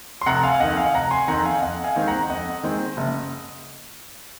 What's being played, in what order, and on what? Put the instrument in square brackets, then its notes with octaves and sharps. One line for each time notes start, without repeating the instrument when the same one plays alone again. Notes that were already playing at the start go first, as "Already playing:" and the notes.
[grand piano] C6
F1 F#5 A#5
F5 G#5
F2 D#3 D#5 F#5
F5 G#5
F1 F#5 A#5
G#5 C6
F2 D#3 F#5 A#5
F5 G#5
F2 D#5 F#5
F5 G#5
D#3 G#3 C4
F#5 A#5
F2 D#5 F#5
D#3 G#3 C4
F#1